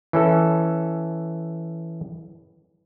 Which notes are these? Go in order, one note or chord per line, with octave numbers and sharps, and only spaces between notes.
E3 C#4 A4